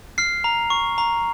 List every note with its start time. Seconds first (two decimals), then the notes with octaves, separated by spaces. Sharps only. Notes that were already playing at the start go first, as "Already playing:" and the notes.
0.18 F6 C7
0.44 A#5
0.70 C#6
0.98 A#5